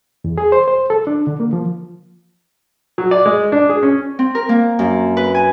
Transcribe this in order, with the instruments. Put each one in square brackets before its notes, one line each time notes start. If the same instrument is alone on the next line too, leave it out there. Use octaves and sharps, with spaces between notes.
[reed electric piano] E2
G#4
C5
C5
A4
D4
D3
A#3
F3
[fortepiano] F#3
D5
G#3
D4
G#4
C#4
[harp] C4
A#4
A#3
F#2
B4
G#5